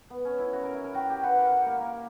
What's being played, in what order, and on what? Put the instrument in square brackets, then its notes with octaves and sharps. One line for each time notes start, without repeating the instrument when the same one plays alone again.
[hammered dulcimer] B3
C#4
E4
F#4
A#4
E4
A#4
[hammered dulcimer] F#4 [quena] G5
[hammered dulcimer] G4 [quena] G5
[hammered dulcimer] B4 [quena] F#5
[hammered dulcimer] A#4
G4
A#3
A#3